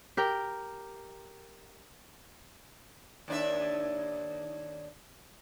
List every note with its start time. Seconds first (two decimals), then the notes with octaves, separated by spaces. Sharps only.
0.17 G4 A#4 G5
3.28 D#2 D4 E5